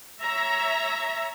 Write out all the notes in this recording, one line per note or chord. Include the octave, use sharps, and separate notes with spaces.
C#5 E5 A#5